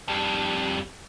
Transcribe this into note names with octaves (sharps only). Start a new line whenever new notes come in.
F2 G3